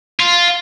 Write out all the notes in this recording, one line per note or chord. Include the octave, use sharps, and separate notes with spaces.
F4